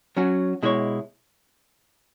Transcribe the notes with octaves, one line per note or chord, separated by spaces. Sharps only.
F#3 C#4 F#4
B2 G#3 E4 C#5